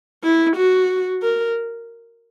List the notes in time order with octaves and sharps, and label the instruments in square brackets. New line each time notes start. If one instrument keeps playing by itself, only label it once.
[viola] E4
F#4
A#4